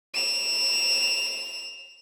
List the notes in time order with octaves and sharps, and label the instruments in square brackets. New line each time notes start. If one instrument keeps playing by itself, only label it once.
[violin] E7 F7